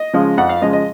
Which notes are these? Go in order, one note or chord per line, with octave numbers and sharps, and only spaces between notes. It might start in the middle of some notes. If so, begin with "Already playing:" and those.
Already playing: D#5
C#3 F3 G#3
F2 F#5
F5
C#3 F3 G#3 D#5
D#5